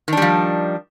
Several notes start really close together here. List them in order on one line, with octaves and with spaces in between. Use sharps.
D#3 D4 G3 F3